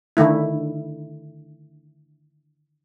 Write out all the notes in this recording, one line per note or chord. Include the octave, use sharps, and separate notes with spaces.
D3 D#3 A3 E4